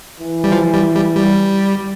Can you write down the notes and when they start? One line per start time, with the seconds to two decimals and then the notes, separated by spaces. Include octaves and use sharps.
0.20 E3
0.44 G3
0.52 F3
0.74 G3
0.95 G3
1.17 G3